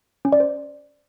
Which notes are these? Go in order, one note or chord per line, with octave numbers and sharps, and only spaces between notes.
C#4
D5
C5